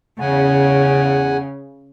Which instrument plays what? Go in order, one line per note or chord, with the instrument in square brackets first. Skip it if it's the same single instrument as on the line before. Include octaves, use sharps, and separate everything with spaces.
[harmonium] E2 F#5 G#5 [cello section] C#3